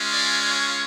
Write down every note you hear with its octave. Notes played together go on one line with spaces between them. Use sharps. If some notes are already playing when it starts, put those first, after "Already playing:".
Already playing: G#3 C#4 F4
D5
C#5